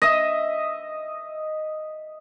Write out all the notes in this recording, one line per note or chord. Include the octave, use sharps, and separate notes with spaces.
D#5 E5